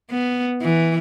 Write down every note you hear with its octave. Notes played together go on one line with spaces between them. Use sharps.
B3
E3